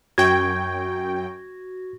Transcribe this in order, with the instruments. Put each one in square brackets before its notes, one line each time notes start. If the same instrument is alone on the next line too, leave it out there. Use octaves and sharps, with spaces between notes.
[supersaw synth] F#2 G5 [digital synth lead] F#4 [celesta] C#6 [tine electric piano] G#6